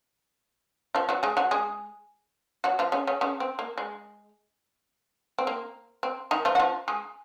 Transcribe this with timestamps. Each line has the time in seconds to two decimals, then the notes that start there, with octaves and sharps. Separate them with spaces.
0.95 F3 F4
1.09 F#3 F#4
1.23 G#3 G#4
1.37 F#3 F#4
1.51 G#3 G#4
2.64 F#3 F#4
2.79 F3 F4
2.92 C#3 C#4
3.07 C#3 C#4
3.21 C#3 C#4
3.40 C4
3.59 A#3
3.78 G#3
5.39 C4
5.47 A#3
6.03 C4
6.31 D#3 D#4
6.45 F3 F4
6.55 F#4
6.59 F3 F4
6.88 G#3 G#4